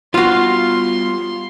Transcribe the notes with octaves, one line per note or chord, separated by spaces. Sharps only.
G3 B3 F4 F#4 F5 C6